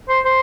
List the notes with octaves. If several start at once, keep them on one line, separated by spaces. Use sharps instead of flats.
C5
C5